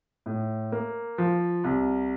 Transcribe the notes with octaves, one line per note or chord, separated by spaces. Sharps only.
A2
A#3
F3
C2